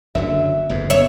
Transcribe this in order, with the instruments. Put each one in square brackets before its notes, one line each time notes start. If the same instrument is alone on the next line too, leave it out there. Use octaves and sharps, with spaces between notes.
[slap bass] F#1 D3 F#3 [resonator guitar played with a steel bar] E5
[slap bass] G1 F2 G#2
[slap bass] F#1 B2 B3 [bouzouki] C#5 E5